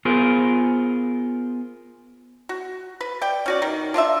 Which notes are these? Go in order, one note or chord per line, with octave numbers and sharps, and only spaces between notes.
B3 F4 G#4 A#4 C5
F#4
B4
D5 G5
C#4 F#4 D5
B2 D#3
D4 F4 B4 E5